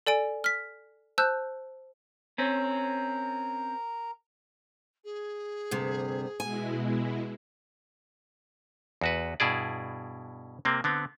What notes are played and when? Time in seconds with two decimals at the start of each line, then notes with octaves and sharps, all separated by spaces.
0.07 A4 D5 G#5 D7
0.44 F6 B6
1.18 C5 A5 E6 F#6 G6
2.38 C4 C#4 A#4 A#5
5.04 G#4
5.71 D2 G2 C3
6.40 B2 G#3 E4 G#5
9.01 E2 F#4 B4
9.40 G2 B2 E4 G#4 D5
10.65 C3 A#3 C4
10.84 D3 B3 C4